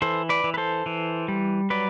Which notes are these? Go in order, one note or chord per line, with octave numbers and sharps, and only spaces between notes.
E3 A4 C5
B4 D5
E3
B4
A4 C5
E3
G3
F#3 B4 D5